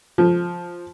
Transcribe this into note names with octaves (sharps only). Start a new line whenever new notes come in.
F3